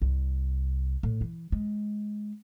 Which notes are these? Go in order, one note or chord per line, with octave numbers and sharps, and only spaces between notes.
C2
A2
E3
G#3